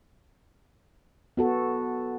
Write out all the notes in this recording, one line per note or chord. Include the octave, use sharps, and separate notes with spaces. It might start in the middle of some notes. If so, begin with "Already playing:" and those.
B3 F#4 A4